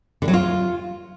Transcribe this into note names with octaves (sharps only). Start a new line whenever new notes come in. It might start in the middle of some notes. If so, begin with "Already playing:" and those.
D3
F#3
F4